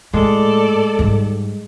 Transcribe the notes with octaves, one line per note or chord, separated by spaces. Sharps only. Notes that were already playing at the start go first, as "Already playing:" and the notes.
A2 G#3 A4 D5
G#2 G3